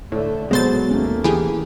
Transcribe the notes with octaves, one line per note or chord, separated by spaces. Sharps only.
A2 D3 A3
A#1 B2 F#3 G#3 B3 C5 A6
D#2 A3 A#3 C#4
E3 G4 G#4